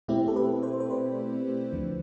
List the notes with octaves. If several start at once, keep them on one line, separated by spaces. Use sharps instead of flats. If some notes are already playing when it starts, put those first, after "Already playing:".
B2 A3 C4 E4 G4
A4
G4 B4
A4 C5
C5
B4 D5
D2 D3 F3